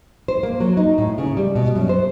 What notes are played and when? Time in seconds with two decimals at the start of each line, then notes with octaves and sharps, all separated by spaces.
0.28 C5
0.43 A#3
0.60 F#3
0.77 D#4
0.98 A2
1.18 C#3
1.37 G3
1.55 B2
1.75 F#2
1.89 C5